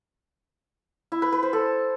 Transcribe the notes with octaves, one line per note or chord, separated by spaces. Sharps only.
E4
B4
B4
C5
A4